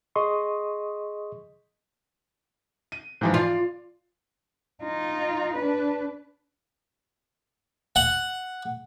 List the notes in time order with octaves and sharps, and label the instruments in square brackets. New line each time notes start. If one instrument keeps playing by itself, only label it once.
[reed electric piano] G#4 D#5 C6 C#6 D#6
[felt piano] D#7
G#2 E3 F3
[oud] F4 [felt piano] D5 C7
[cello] D#4 F4
D4 B4
[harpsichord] F#5